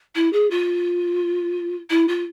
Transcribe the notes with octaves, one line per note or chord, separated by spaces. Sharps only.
E4
G#4
F4
E4
F4